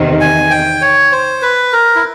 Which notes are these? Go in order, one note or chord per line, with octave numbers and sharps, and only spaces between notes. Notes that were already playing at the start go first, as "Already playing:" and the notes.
Already playing: E2 C3 D#3
G#5
G5
C#5
C5
B4
A#4
E4